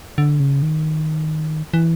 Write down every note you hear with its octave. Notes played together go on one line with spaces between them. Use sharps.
D3
C#3
D#3
E3